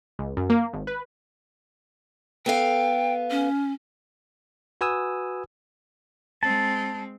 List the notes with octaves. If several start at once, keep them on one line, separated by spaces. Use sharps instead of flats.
C#2
F#2
A#3
G#1
B4
B3 A4 F5 G5
C#4
F#4 B4 G#5 D#6 E6
G#3 C4 A5